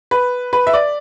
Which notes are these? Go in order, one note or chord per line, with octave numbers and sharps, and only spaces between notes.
B4
B4
E5
D5